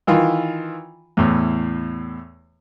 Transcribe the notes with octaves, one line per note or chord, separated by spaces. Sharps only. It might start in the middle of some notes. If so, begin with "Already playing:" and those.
D#3 E3 F4
E2 A2